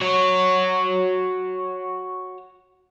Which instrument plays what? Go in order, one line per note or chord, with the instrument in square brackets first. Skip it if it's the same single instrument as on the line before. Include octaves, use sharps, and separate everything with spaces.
[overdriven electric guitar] F#4 C#5